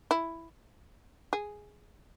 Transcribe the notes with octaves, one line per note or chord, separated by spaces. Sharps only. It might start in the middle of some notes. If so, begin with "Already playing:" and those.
E4
G#4